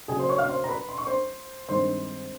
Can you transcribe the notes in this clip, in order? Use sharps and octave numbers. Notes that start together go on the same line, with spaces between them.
C#3 F#3 A#3 G#4 G#5
C5 C6
C#5 C#6
F5 F6
C5 C6
A#5
B4 B5
C6
C#6
C5 C6
G2 D#3 G#3 C4 C5 C6